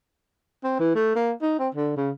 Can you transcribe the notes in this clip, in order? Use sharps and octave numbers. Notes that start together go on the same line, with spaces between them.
C4
E3
A3
A#3
D#4
C4
D3
C#3